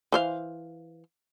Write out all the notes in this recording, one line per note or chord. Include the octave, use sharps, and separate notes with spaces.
E3 C5 F5